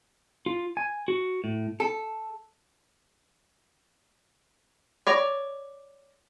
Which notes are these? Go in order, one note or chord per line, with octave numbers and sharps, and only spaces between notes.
F4
G#5
F#4
A2
A4
C#5 D5 A#5